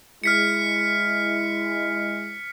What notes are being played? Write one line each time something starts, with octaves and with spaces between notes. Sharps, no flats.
G#3 E4 F6 B6 C#7